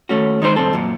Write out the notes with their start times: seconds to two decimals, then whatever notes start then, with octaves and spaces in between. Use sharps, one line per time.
0.09 D#2 A3 C#4 F#4
0.42 D#3 G#3 D#4 C5
0.56 C2 F2 C4 A4
0.73 F#2 A#2